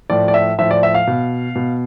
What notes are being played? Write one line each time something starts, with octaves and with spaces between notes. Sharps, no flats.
A2 F3 D5
D5
E5
A2 F3 E5
D5
E5
F5
B2
B2